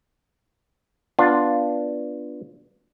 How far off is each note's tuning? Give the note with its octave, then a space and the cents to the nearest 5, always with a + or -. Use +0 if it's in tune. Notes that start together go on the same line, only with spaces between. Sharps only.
B3 -10 D4 +0 F4 +0